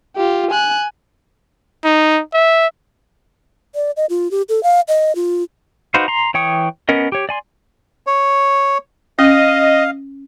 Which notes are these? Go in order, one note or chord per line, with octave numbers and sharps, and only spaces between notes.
F4 G4
G#5 F#6
D#4
E5
D5
D#5
F4
G4
A4
F5
D#5
F4
D#4 F#4 B4 C5 F5
A#5 C6
E3 C#5 G5 C#6 D#6
B3 C#4 A#4 D#5
G4 C#5
D5 G#5 C6
C#5
C#4 D#5 F5